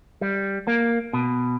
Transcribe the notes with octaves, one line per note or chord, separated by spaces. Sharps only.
G3
A#3
B2